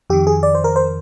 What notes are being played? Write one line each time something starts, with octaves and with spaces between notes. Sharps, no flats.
F2 D#3 G4
G#4
D5
C5
A#4
C5